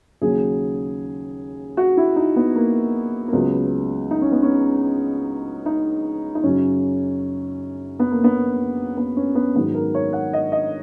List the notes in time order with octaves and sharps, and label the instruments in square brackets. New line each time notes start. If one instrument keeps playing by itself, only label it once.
[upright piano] D#2 C#3 F#3 G#4
F#4
E4
D#4
B3
A#3
A#3
C#2 C#3 F#3 B3
D#4
C#4
B3
C#4
D#4
D#4
F#2 C#3 F#3 C#4
B3
A#3
B3
B3
C#4
B3
G#2 D#3 F#3 B3
A#4
C#5
F#5
D#5
D#5